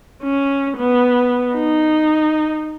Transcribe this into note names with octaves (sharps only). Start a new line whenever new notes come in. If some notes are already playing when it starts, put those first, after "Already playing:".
C#4
B3
D#4